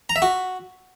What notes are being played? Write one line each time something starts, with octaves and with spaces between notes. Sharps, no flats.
A#5
E5
F#4